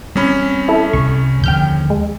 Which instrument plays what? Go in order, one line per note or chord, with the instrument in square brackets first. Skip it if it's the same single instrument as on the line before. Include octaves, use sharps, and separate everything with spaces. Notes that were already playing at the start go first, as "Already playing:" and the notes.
[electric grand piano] E2 C#4 B5 [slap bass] G3 C4
[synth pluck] E4 A4
[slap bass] C2 G3 [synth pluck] C#6
[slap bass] D#2 D3 F3 [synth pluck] G5 F6 G6
[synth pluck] G#3